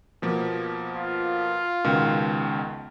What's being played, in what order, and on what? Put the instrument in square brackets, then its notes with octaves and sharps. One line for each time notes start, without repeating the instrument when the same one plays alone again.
[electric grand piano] B2 F3 A#3
[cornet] F4
[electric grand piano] C#2 B2 D#3